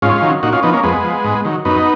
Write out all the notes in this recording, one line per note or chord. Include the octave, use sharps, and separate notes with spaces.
G#2 C#4 F4
D#3 F#3
A#2 D#4 F#4
C#4 F4
F3 B3 D#4
A#3 C#4
F2 G#3 B3
F3
G#2
D#3 F#3
F#2 B3 D#4